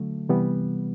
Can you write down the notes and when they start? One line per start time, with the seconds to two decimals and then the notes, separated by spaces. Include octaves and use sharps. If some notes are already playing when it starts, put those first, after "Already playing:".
Already playing: D3 F#3 A3
0.29 C3 E3 G3 B3